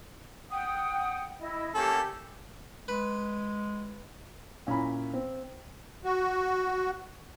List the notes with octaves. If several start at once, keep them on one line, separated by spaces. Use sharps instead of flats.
F#5 G5 D#6
E4 D#5
A#3 C#4 G4 A4
G#3 B4
A#2 C#4 E4 A#5 B5
C4
F#4